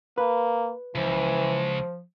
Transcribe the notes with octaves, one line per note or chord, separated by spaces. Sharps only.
A#3 B4
C#2 E3 F3